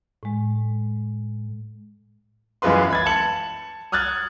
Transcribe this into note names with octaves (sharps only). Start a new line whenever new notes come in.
A2 G#3
F#2 E3 G#3 F4 B4 C6
B5 G#6 A6
A5 C#7 F#7
D#6 F6 F#6 G#6 A6